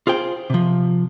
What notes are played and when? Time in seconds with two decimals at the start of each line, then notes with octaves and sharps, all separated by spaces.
0.07 F4 G#4 C5 G5
0.50 C3 F3